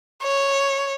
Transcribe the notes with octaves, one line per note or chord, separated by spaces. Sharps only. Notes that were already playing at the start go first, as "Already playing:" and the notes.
C#5